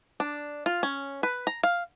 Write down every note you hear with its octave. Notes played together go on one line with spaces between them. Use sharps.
D4
F4
C#4
B4
A#5
F5